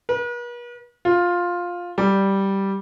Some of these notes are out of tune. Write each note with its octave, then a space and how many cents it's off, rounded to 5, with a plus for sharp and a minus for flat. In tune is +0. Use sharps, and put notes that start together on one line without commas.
B4 -45
F4 +10
G3 -5